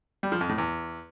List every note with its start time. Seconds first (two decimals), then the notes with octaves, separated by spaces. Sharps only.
0.23 G3
0.32 F3
0.41 F2
0.49 A2
0.58 E2